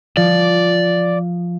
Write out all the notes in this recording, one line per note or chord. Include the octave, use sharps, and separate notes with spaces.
F3 D5